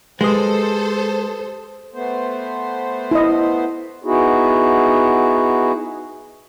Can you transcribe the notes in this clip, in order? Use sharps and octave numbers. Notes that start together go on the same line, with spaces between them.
G#3 G4 A4 B4 C5 D#6
A3 B3 C5
E4 D#5
B3 D#4 E4 F#4 G#4